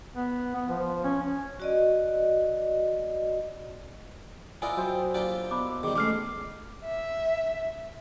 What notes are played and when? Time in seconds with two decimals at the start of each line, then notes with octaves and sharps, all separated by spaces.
0.16 B3
0.55 B3
0.68 F3
1.04 C#4
1.22 C#4
1.60 F#4 D5 D#5
4.62 E4 F4 A#4 D5 D#5 F#5 G#5
4.77 F#3 C5 E5 G5
5.14 A#3 D4 F4 G4 D5
5.51 B2 D4 B5 D6
5.83 D#3 G3 G#4 D6
5.96 C#2 G#3 A3 D6 F6 C7
6.84 E5